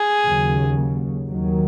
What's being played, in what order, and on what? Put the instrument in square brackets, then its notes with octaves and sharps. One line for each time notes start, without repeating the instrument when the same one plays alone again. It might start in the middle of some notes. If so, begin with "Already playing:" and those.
Already playing: [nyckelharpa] G#4
[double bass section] D#2 C#3 F#3
D#2 D#3 F#3